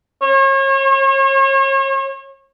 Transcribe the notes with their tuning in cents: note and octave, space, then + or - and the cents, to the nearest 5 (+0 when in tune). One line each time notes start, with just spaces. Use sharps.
C#5 -35